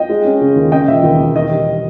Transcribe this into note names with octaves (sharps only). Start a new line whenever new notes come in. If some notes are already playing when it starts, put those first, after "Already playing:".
Already playing: D#5 G5
G#3
C#4
C#3
D#2
C#3 D#5 G5
E1 E5
D#2
E1
D#3 D#5
G3